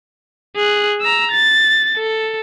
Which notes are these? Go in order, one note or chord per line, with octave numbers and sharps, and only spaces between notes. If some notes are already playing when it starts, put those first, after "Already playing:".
G#4 F#6
A#5 E6
A6
A4